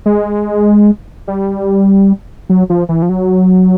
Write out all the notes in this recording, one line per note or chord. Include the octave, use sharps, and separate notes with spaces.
G#3
G3
F#3
F3
E3
F3
F#3